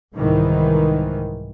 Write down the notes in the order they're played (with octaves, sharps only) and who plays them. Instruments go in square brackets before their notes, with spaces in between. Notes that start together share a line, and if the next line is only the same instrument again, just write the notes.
[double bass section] C2 G#2 D#3 E3